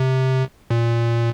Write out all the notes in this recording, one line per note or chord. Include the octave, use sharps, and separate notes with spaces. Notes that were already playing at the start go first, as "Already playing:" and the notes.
Already playing: C3
A#2